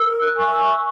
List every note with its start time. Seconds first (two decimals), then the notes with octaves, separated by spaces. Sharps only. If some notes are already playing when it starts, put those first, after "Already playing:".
Already playing: A#4 E6
0.12 E6
0.22 F#6
0.36 E5 G#5 C#6
0.52 E6